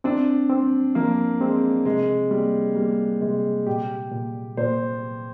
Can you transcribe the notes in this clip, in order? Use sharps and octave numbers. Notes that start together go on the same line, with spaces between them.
C4 D4
C4
F3 A#3
G#3 C4
C3 G#3
G3 A#3
G3 A#3
C3 G#3
A#2 G4
A#2
A#2 C5